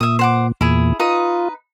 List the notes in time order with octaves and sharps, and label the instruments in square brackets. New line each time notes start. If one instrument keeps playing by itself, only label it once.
[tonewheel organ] A#2 [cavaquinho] E5 D#6
[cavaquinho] C5 F#5 D6
[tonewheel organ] E2 A#2 [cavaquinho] E4 G#4
[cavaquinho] D#4 B4 D#6 [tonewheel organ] F4